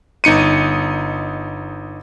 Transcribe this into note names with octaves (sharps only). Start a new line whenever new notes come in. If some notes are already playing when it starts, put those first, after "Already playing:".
G1 D#4 C#7 D#7